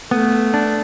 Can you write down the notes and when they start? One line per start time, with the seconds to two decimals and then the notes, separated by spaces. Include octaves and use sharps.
0.11 A3 B3
0.54 D4